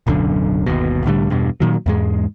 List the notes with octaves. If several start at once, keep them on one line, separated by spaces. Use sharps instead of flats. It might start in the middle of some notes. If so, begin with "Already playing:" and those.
D1 B1 F#2 D3
G1 D#2 B2
C2 A2 D3 G3
E2 G2 B2
A#2 D#3 F#3
E2 G#2 G#3